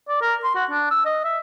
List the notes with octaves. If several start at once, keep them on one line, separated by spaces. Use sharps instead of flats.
D5
A#4
C6
F#4
D4
E6
D#5
E5